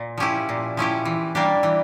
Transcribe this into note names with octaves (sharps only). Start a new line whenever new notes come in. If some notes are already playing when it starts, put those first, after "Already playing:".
Already playing: A#2
F3 C#4 E4 G4
A#2
F3 C#4 E4 G4
E3
G3 A#3 D4 G4
E3